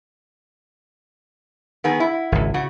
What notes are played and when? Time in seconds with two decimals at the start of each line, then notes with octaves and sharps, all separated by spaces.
1.84 D#3 B3 G#4
2.00 E4
2.32 G#1 C#2
2.54 C#3 F#4